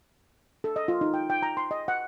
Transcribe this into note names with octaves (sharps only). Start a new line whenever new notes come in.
A4
D#5
F4
D#4
G5
G5
A#5
C6
D#5
F#5